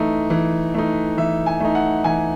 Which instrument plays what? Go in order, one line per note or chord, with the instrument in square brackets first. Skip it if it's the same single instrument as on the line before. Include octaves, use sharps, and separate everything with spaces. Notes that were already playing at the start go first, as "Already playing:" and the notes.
Already playing: [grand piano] E3 A3 D#4
E3
A3 D#4
E3 E5
G#5
A3 D#4
F#5
E3 G#5